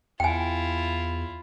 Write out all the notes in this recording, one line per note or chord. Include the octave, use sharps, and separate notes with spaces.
E2 E4 F4 G5 G#5